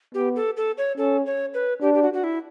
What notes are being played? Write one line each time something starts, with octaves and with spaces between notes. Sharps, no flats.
B3 G4
A4
A4
C#5
C#4 A4
C#5
B4
D4 G4
G4
F#4
F#4
E4